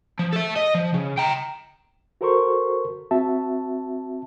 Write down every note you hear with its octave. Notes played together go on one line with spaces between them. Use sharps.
F3
A4 E5
D#5
F3
C#3
G5 A#5
F#4 A4 A#4 C5 C6 C#6
C4 F#4 E5 A5